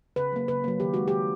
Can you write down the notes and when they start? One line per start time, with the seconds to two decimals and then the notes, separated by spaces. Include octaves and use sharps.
0.16 C#3 B4
0.32 F#3 A#3
0.48 C#3 B4
0.64 F#3 A#3
0.80 D#3 G4
0.94 G#3 F#4
1.08 D#3 G4